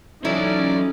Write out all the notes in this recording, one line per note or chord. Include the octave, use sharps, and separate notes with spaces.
E3 F#3 C#4 D#4 E4 A4 D5